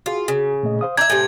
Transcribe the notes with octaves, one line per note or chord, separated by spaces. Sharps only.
F4 F#4 G#4
C#3
A#2 A3 D#5
C5 F5 D#6
D4 E5 A#5 G6 G#6
A2 C3 G#5 G6